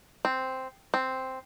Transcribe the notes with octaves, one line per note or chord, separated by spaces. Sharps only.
C4
C4